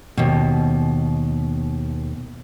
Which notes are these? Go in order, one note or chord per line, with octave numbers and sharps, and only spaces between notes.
D#2 B2